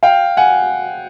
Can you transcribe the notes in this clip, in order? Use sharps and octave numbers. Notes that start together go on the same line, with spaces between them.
F5 G5
F#5 G#5